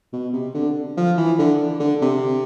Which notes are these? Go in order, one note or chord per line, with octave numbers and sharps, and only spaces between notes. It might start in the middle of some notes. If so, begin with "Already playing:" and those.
B2
C3
D3
F3
E3
D3
D3
C3